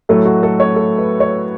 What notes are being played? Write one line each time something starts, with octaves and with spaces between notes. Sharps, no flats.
A2 F#3 A3 A4
F#4
A4
C#5
A4
B4
C#5